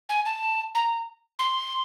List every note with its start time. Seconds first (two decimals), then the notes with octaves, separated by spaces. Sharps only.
0.09 G#5
0.26 A5
0.75 A#5
1.39 C6